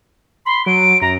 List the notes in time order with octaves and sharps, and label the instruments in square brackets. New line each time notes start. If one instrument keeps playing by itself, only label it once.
[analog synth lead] B5 [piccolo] C6
[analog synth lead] F#3 [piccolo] D7
[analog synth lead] F#2 [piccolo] A#5